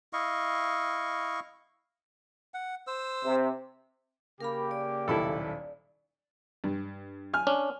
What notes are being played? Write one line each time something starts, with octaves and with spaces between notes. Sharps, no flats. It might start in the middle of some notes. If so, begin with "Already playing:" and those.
E4 D#5 F5 C#6
F#5
C5 E6
C3
C#3 A#3 G4 A#4 F5 B5
D5
D#1 B1 E4 A4 B5
G2
G#5 F6
C#4 D4